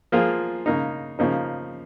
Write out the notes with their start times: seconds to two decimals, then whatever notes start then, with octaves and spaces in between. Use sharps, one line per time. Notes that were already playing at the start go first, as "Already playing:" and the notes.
0.12 F3 A#3 F4 G#4
0.66 C#3 A#3 D#4
1.19 C#3 F3 A#3 D#4